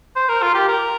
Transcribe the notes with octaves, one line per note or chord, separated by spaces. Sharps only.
C5
A#4
F4
G4
A#4